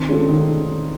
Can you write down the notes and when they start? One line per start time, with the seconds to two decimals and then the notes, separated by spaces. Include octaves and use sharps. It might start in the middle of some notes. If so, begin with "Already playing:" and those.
Already playing: D#3 C4
0.08 G#3 C#4 D4 F4 A4
0.28 D#3 D#4